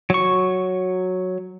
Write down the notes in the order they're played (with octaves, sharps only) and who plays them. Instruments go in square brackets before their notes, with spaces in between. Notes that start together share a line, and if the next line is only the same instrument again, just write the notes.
[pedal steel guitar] F#3 C#6